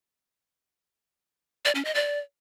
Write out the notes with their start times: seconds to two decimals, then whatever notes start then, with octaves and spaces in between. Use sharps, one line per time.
1.65 D5
1.75 C#4
1.85 D#5
1.95 D5